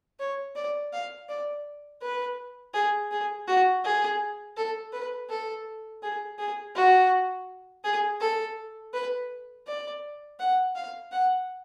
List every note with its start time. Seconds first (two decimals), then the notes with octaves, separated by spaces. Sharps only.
0.19 C#5
0.55 D5
0.93 F5
1.29 D5
2.02 B4
2.74 G#4
3.11 G#4
3.47 F#4
3.84 G#4
4.57 A4
4.93 B4
5.29 A4
6.03 G#4
6.39 G#4
6.75 F#4
7.84 G#4
8.20 A4
8.93 B4
9.67 D5
10.39 F#5
10.75 F5
11.12 F#5